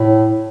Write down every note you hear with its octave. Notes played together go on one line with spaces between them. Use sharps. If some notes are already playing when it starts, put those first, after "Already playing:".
Already playing: A2